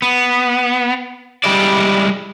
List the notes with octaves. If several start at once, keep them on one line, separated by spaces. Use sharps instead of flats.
B3
G3 G#3 E4 D5